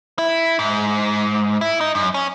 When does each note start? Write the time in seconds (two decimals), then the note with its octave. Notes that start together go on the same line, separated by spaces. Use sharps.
0.19 E4
0.59 G#2
1.61 E4
1.81 D#4
1.95 F#2
2.14 C#4